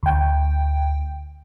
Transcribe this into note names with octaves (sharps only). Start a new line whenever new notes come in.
D2 G5